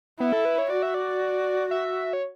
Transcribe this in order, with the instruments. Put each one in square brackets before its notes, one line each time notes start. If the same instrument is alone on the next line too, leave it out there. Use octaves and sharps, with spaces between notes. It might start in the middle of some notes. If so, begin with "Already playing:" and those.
[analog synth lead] B3 [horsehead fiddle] E4
[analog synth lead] A4
B4
C#5
[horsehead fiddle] F#4 [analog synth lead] D5
[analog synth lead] E5
D5
E5
C#5